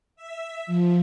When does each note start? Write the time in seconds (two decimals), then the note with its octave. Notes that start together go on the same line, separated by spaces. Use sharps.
0.16 E5
0.67 F3